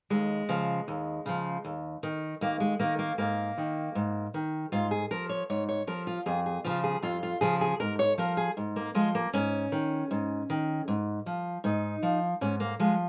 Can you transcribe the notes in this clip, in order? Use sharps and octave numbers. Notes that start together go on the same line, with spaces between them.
D#2 G#3
C#3 F3
D#2
C#3 F3
D#2
D#3
D#2 A#3
G#3
D#3 A#3
A#3
G#2 A#3
D#3
G#2
D#3
G#2 F4
G#4
F3 A#4
C#5
G#2 C#5
C#5
F3 A#4
F4
F2 G#4
G#4
C#3 F3 F4
G#4
F2 F4
F4
C#3 F3 G#4
G#4
G#2 A#4
C#5
F3 A#4
G#4
G#2
A#3
F3 G#3
A#3
G#2 C#4
D#3
G#2
D#3
G#2
F3
G#2 D#4
F3
G#2 C#4
A#3
F3 G#3